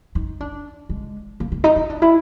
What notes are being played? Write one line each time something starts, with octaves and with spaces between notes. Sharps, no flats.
D#4
D4
G#3
A#3
A#3
D#4
D#4
D4
E4